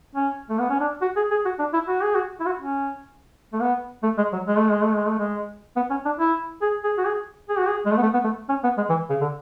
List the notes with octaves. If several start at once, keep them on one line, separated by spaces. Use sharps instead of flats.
C#4
A3
B3
C#4
D4
F#4
G#4
G#4
F#4
D4
E4
F#4
G#4
F#4
E4
F#4
C#4
A3
B3
A3
G#3
F#3
G#3
A3
G#3
A3
G#3
A3
G#3
B3
C#4
D4
E4
G#4
G#4
F#4
G#4
G#4
F#4
G#4
G#3
A3
B3
A3
B3
A3
C#4
B3
G#3
E3
C#3
D3